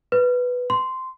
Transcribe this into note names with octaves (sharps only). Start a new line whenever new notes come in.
B4
C6